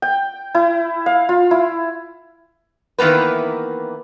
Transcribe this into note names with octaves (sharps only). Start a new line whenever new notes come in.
G5
E4
F5
F4
E4
D#3 E3 A#3 B3 B4